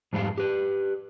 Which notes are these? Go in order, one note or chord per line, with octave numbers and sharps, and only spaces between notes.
F2 G#2 G3 B3 F5
G4 B4